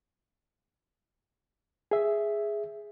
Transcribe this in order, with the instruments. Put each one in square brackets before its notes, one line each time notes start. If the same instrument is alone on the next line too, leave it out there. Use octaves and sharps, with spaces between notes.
[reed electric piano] G#4 E5